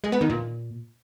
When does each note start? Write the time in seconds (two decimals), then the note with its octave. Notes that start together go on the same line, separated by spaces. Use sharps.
0.04 G#3
0.12 B3
0.21 D#3
0.29 A#2